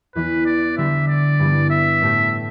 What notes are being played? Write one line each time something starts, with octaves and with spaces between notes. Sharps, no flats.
E2 E3 B3 B4
D5
D3 G3 D4 G4 E5
D5
G2 E3 G3 B3
E5
A2 A3 G4